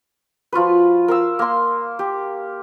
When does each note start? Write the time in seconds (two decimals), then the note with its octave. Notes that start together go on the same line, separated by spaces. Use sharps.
0.52 F3 F4 F#4 B4
1.08 A#4 F5 E6
1.39 A#3 C6
1.99 G4